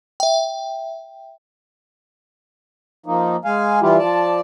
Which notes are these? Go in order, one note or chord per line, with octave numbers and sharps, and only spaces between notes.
E5 G5
F3 A#3 D#4
G#3 F5 G#5
E3 G3 E4 F4 G4
F3 D5 A5